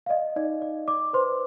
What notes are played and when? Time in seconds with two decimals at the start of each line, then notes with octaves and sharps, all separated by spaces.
0.06 F5
0.09 D5 D#5
0.36 D#4 D5
0.62 D5
0.88 D5 D6
1.13 B4 C5 C6